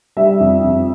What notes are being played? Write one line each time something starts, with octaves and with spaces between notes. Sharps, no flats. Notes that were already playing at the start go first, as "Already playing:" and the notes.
G3 E5
F2
F2